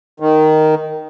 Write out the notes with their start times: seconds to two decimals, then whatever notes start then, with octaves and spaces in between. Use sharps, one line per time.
0.20 D#3